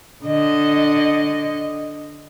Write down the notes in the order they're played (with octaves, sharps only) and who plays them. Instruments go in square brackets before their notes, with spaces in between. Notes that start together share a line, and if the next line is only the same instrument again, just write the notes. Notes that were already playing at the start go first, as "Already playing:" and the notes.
[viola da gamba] D3 D#5